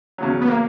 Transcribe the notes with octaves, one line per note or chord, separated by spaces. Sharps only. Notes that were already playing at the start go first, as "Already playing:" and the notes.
E2 C#3 F#3
B3
A#3